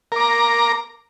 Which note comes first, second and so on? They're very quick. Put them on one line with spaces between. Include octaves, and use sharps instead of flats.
A#4 D6 A#5